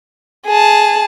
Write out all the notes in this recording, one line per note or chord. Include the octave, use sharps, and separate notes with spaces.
G#4 A5